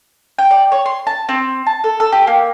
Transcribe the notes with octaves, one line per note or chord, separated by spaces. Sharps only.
G5
D5
C#5
C6
A5
C4
A5
A4
A4
G4
A#3